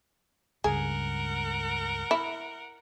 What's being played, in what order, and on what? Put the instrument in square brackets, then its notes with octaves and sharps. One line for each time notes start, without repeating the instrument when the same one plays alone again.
[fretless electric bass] C#2 G2 C#3 [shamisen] G#4 [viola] A#4 F#5
[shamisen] E4